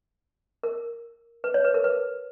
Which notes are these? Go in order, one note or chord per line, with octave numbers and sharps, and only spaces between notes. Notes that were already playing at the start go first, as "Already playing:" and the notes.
A#4
B4
C#5
B4
A#4
B4